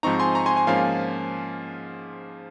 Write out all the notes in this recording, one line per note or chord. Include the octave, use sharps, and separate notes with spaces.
G#2 F3 C4 D#4 A#5 C#6
G#5 C6
A#5 C#6
G#5 C6
G#5 C6
G#2 F3 A#3 C#4 F4 F5 G#5